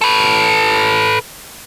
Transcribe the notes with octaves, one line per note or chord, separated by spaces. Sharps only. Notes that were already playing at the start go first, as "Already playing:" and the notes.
A4 B4